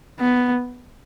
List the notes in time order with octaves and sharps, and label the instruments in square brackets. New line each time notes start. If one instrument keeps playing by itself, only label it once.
[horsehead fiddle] B3